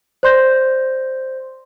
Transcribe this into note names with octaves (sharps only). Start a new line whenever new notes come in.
C5 D5 C6 G6 A#6